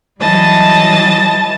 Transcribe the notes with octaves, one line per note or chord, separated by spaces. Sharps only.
E3 F#3 G3 D#5 A5 A6